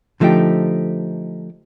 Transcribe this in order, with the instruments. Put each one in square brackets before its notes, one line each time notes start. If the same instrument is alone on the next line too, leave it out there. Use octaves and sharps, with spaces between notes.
[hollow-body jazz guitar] D3 F3 A3 D#4 G4